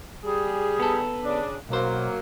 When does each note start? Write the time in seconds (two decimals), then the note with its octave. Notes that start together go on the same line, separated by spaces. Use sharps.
0.23 G3 G#4
0.79 B3 A4
1.23 C#3 D4
1.69 B1 F#3 A#3 C5